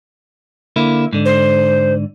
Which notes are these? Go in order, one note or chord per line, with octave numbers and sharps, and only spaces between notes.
D3 A#3 E4
G#2 D3
C5